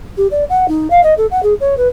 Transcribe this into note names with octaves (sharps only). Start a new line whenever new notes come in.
G4
D5
F#5
D#4
F5
D#5
A4
F#5
G#4
C#5
B4